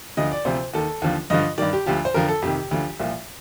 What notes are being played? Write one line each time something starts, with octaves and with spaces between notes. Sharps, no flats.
D2 D3 F3 D#5
D5
D2 C3 F3 C5
D#2 D#3 A4
D#2 D3 F3
G2 D3 F3 D#5
G2 D#3 D5
G4
D2 D3 F3 G4
C5
F2 D3 F3 A#4
A4
F2 C3 D#3 G4
D2 D3 F3
C2 A#2 F3